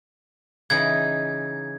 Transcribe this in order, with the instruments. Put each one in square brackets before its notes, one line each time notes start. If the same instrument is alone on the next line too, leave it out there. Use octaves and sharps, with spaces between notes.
[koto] C#3 E3 D#4 [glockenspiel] G#6